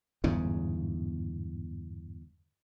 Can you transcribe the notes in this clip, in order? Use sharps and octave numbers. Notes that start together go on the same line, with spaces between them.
G1 E2 G#2 C#3